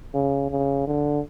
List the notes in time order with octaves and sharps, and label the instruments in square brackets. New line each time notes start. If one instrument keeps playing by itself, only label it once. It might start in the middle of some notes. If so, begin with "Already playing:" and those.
[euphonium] C#3
C#3
D3